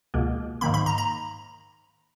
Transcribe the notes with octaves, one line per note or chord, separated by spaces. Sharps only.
C#2 B2 A#3
G#2 D#3 A#3 B5
B5
A#5
A#5